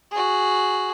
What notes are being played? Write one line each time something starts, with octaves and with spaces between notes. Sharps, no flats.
F#4 G#4